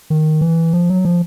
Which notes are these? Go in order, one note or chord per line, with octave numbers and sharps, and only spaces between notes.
D#3
E3
F3
F#3
F3